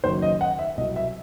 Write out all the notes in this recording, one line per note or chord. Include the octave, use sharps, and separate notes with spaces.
F#1 F#2 D#3 C5
D#5
F#5
E5
C2 B2 F#3 D#5
E5